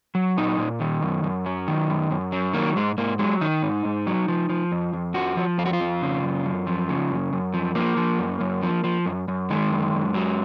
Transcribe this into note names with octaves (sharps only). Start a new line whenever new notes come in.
F#3
A#2 D#4
A#2
D#3
F#2
F#2
F#3
D#3
F#2
F#2
F#3
D#3 A#3
G#2 G#3
G#2 A#3
F#3 G#3
D#3 D#4
G#2
G#2
F#3
F3
F3
F2
F2
F3 F#4
F3
F2 F4
F#4
F4
F2
C#3
F#2
F#2
F3
C#3
F#2
F#2
F3
F3 A#3
F3
F#2
F#2
F3
F3
F#2
F#2
D#3 G#3
F#2
F#2
F#3